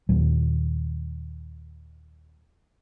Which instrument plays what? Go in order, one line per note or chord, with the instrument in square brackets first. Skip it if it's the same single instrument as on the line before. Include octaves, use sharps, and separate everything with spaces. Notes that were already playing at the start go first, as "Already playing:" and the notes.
[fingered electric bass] D#2 A#2 D#3 F#3